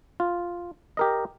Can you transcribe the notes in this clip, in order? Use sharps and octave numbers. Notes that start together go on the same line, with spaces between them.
F4
G4 A#4 D#5